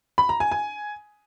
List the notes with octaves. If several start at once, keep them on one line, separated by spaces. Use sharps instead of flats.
B5
A#5
G#5
G#5